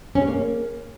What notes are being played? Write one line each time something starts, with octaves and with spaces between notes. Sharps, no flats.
C#4
G#3
A#3